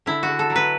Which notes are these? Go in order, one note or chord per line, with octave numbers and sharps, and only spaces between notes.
D3 E4
F#4
D3
A4
F#3
B4